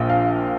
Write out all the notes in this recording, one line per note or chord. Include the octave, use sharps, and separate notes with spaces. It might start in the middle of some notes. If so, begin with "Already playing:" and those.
Already playing: A#1 A#2 F3 G5
F5